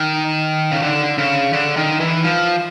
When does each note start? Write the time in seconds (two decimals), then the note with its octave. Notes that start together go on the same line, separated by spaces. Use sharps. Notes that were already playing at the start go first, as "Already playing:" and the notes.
Already playing: D#3
0.71 C#3
0.82 D3
1.18 C#3
1.53 D3
1.76 D#3
2.00 E3
2.24 F3